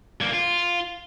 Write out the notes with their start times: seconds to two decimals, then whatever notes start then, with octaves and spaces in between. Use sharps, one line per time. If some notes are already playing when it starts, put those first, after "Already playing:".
0.21 G2 A#3
0.33 F4